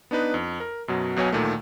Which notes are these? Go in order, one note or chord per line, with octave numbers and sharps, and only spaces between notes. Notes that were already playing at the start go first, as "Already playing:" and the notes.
B3 D4 D#4 B4
F2
A#4
F#2 B2 F#3
B1 B2 F#3 C#5 G#5
D2 A#2 D#3 A3